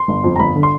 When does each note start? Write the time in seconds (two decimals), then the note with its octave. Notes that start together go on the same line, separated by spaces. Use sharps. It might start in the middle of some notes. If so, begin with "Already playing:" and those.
Already playing: C6
0.08 G1
0.24 F2
0.36 A#5
0.40 G1 B5
0.56 D3
0.63 C6